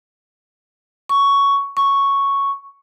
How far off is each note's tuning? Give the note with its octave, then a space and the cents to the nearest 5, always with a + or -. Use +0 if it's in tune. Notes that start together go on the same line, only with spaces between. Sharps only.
C#6 +10
C#6 +0